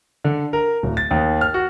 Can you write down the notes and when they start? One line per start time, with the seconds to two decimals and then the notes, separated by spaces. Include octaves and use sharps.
0.24 D3
0.53 A#4
0.83 D1
0.97 A6
1.11 D#2
1.41 F6
1.54 F#4